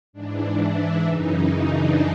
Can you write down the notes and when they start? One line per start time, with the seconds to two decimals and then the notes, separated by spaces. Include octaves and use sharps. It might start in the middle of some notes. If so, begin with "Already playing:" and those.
0.13 G#2 E3 D4
0.59 E4
1.05 F#2 C#3 E3 D#4
1.36 D#4
1.65 D4